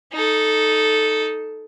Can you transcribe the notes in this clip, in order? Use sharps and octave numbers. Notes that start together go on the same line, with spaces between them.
D#4 A4